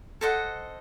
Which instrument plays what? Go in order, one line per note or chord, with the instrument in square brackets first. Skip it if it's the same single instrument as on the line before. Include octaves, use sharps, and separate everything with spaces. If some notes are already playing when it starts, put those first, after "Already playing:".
[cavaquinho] A4 C5 D#5 F#5